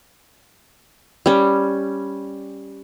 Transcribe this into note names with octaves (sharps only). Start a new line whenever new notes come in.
G3 C#4